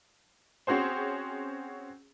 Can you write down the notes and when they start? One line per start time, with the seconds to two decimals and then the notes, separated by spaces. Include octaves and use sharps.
0.67 C4 C#4 F#4 G#4 C5